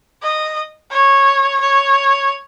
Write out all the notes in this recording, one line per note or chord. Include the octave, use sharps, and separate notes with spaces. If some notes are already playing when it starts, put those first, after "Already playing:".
D#5
C#5
C#5